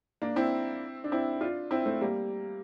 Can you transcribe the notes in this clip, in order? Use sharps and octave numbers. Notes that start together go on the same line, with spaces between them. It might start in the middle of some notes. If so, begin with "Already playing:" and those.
A#3 D4
C4 E4
D4
C4 E4
D4 F4
C4 E4
A3 C4
G3 A#3